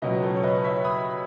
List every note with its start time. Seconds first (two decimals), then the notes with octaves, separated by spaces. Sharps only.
0.02 C#2 B2 F#3 B4 D#5
0.23 A4 C#5
0.36 C#5
0.43 B4 D#5
0.64 C#5 E5
0.84 B5 D#6